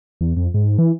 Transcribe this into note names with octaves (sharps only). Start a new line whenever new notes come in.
E2
F2
G#2
E3